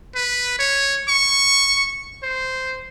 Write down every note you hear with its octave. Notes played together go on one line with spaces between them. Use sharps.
B4
C#5
C#6
C5